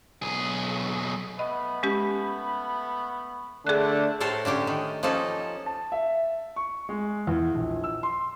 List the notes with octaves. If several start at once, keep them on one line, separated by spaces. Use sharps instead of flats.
B1 G#4
A3 B3 D#5 B5
G#3 C#4 G4
D3 A3 D4 G#4 F#6
A2 A3 A4 A#4 C5
D3 C#4 D4 G4
D#3
F3 A#3 C#4 D#4 A4
A5
E5
C#6
G#3
E2
A#1
E6
C6